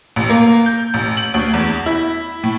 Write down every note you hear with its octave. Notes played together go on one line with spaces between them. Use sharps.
A1
A#3
G6
A1
F#7
D2
E2
E4
A2